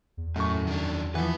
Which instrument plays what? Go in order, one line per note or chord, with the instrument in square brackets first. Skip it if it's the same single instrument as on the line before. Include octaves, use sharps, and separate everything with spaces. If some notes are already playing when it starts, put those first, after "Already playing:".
[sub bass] E2
[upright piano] F#2 C#6 [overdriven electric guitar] A2
[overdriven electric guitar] D#3 D4
[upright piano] E3 F3 [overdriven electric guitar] B4 F#5